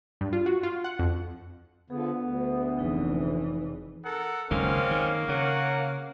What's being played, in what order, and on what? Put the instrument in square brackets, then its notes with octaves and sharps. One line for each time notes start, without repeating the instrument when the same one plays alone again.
[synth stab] G2
F4
F#4
F4
F#5
F2
[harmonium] D3 F3 [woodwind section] B3 [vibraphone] G#4
[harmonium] D2
[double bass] F1 E3 [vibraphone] D#4 G#4 B4
[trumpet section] A4 A#4 F#5
[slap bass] F#1 C#2 D#3 [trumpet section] G#3 C4 C#4 [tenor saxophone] A#3
[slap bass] D#3
[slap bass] C#3 [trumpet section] A#4 C#5 F#5